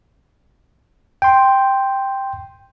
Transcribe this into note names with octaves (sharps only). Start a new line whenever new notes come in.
G5 C6